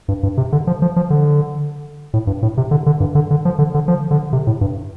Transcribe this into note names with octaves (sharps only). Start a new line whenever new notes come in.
G2
G2
C3
D3
F3
F3
F3
D3
A2
G2
A2
C3
D3
D3
G2
D3
D3
F3
D3
D3
F3
D3
C3
A2
G2